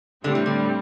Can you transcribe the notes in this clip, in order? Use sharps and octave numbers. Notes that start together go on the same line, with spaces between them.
A2 D3 G3 C4
E3
D3